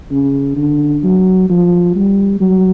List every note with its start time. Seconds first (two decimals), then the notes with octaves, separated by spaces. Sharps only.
0.11 C#3
0.57 D3
1.03 F#3
1.49 F3
1.96 G3
2.40 F#3